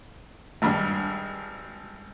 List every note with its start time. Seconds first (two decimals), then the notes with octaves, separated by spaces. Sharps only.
0.62 G#1 G2